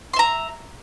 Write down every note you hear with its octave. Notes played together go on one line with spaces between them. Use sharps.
E5 A#5 C6